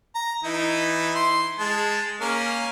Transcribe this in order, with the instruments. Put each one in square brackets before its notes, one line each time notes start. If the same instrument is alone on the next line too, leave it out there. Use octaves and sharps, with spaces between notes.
[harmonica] A#5
E3 D#4 E4
C6
G#3 A5
A#3 C#4 A#4